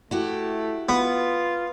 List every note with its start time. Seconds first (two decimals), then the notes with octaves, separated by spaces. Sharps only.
0.11 A3 E4 F#4 G4
0.89 B3 F4